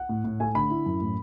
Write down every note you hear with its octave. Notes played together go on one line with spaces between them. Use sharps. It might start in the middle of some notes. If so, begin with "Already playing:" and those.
Already playing: F#5
A2
A2
A3 G#5
D3 B5
E4
F#2
A2